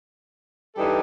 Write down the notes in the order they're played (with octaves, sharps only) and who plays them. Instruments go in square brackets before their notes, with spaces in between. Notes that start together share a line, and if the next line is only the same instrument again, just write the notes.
[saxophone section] G2 E3 G3 D#4 A4